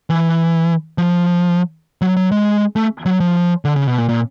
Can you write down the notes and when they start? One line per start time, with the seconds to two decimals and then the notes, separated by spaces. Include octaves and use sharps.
0.10 E3
0.98 F3
2.02 F#3
2.17 F#3
2.32 G#3
2.76 A3
3.06 F#3
3.20 F3
3.65 D3
3.76 C#3
3.87 B2
3.98 A#2
4.09 A#2